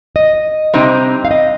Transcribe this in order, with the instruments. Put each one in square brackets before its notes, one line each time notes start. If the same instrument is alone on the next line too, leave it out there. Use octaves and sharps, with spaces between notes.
[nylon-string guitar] D#5
[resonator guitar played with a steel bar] C3 G3 C4 D#4
[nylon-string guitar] F5
D#5